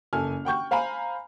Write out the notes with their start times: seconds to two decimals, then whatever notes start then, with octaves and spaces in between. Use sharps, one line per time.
0.13 F#1 A4 G#5 F6
0.45 F#5 G5 C#6 G6
0.71 C5 F5 G#5 A#5 B5